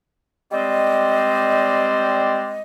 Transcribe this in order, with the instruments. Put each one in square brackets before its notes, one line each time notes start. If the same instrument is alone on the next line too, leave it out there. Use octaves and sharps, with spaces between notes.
[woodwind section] G3 G#3 C4 C5 D5 D#5